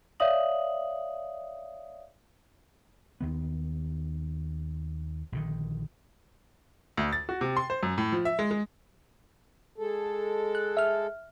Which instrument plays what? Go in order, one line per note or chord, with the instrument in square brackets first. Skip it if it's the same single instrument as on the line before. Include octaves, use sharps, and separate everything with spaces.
[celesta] C#5 D5 E5 F5 D#6 F#7
[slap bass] D#2 D#3 B3
A#1 D3 D#3
[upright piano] D2
A6
F#4
C3
C6
C5
F#2
A2
F3
E5
G#3
G#3
[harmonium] G#3 A4
[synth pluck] F#6
E5 F6